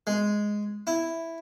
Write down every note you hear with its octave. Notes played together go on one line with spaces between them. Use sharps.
G#3
E4